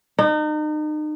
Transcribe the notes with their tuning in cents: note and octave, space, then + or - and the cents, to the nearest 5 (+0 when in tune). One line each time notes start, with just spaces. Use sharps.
D#4 -35